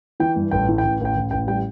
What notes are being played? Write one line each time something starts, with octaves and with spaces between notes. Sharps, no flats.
E3 G5
G2
A1 G5
E3
G5
A1
A1 G5
A1
A1 G5
G3 G5